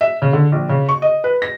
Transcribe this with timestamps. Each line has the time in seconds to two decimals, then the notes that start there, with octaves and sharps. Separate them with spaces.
0.01 E5
0.22 C#3
0.33 D3
0.52 A#1
0.69 C#3
0.89 C#6
1.02 D#5
1.24 B4
1.42 A#6